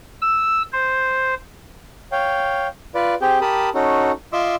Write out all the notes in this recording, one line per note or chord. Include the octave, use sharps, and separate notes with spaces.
E6
C5
C#5 F5 G5
F4 B4 D5
C4 G4 G#4 G5
G4 A#4 A5 B5 D#6
C#4 D#4 F#4 A4
F4 D#5 E5 C6 D6 E6